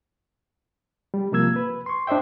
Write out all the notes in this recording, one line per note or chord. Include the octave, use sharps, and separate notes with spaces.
G3
C3 F3 A#3 F4 E6 G#6
B4
C6 C#6
D4 C5 D#5 E5 G5